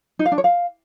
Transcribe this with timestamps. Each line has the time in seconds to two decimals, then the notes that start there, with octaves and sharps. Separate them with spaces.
0.19 D#4
0.26 F5
0.32 D4
0.38 C#5
0.44 F5